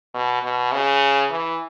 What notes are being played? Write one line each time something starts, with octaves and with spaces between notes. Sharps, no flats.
B2
B2
C#3
E3